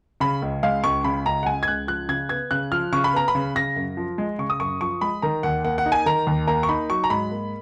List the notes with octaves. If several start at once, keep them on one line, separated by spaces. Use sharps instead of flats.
C#3 B5
C#2
G#3 F5
C#2 C#6
C#3 B5
C#2 A#5
F#5
G#3 G#5
G#6
C#2 F#6
F3 F#6
C#3 G#6
B3 G#6
C#3 F#6
F3 F6
C#3 C#6
B5
B3 A#5
B5
C#3
C#3 A#6
F#2
F3
G#3
C#3 C#6
D#6
F#2 C#6
F3 C#6
G#3 B5
D#3 A#5
D#2 F#5
A#3 F#5
F#5
D#4
G#5
D#3 A#5
D#2
A#3 A#5
C#6
D#4 B5
F#3 C#6
A#5
G#2 B5
A#3